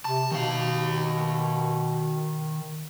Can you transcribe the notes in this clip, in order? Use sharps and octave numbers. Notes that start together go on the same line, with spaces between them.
C3 A5
B2 D#3 F5